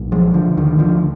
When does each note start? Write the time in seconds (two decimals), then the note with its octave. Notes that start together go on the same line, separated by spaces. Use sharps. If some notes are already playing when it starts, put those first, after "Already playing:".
Already playing: B1 A#2
0.12 F3 G#3
0.34 D3 F3
0.57 D2 D3 D#3
0.79 D3 F3